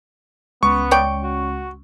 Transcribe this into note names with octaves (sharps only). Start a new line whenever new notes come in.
C#2 B3 C#6
C#5 D5 G5
F#4